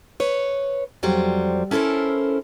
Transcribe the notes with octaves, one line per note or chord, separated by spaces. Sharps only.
B4 C#5
F2 F#3 G3 C5
C#4 E4 A4 A#4 C5